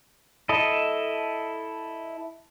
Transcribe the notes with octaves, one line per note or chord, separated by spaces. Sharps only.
E4 A4 D#5